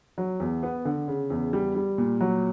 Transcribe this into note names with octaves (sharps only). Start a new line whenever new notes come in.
F#3
E2
B3
D3
C#3
E2
G3
G3
A#2
F#3